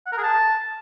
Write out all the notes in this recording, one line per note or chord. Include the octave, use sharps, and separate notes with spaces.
F#5
A#4
G#4
A5